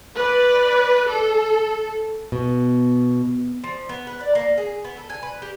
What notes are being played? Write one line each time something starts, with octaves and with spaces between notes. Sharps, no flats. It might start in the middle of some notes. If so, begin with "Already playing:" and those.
B4 D5
A4
B2
F3
B3
B4
D5
A#3
G#4
B3
A4
G#5
B4
G4